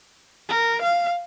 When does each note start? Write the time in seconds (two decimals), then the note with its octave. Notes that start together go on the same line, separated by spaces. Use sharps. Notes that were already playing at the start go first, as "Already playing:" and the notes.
0.49 A#4
0.82 F5